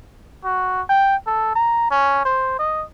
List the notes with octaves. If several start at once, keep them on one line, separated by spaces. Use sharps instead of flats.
F#4
G5
A4
A#5
C#4
C5
D#5